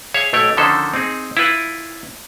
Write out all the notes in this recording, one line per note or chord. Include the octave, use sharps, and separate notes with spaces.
G#4 C#5 E5 F5
B1 A3 C#5 G5
D3 D#3 F3 C#4 A4 C5
C4 D#4 G#4
E4 F4 B4